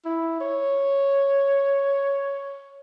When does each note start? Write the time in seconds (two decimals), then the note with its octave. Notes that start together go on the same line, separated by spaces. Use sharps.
0.05 E4
0.40 C#5